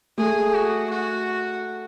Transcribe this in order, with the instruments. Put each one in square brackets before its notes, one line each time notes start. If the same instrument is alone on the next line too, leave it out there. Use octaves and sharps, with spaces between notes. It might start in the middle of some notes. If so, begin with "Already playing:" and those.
[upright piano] A3 [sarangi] G#4
[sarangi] F#4
F#4